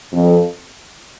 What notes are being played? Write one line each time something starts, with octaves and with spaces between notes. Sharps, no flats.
F2